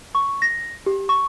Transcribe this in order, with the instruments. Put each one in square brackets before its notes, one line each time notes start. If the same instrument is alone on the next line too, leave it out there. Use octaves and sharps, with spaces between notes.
[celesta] C#6
A#6
G4
C#6